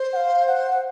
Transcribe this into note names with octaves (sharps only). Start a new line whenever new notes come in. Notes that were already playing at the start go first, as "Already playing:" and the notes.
Already playing: C5
F#5
F5
F#5
F#5